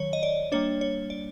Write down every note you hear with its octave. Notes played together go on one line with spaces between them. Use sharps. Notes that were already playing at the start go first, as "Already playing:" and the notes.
Already playing: D#3 F#3 C#5
D#5
D5
G3 A#3 D4 C#5
C#5
D5